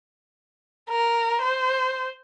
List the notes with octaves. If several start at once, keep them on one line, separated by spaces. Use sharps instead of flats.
A#4
C5